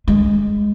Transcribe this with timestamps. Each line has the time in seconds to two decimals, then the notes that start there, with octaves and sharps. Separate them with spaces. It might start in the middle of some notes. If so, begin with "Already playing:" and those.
0.08 G#3